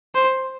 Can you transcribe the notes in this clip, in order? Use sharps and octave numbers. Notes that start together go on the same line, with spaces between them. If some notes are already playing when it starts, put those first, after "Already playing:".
C5